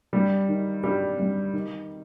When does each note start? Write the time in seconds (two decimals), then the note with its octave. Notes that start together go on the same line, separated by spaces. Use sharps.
0.13 G2 G3
0.48 D#3
0.84 G2 G3
1.19 G2
1.53 D#3